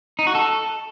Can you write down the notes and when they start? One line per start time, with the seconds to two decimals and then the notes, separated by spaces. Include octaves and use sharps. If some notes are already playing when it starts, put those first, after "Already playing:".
0.19 D#4
0.27 F#4
0.35 A4